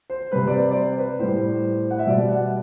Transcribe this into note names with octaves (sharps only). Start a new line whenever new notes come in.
C5
C3 G3 B4
D5
C5
D5
C5
B4
A2 G3 C5
F#5
E5
B2 G3 D5
F#5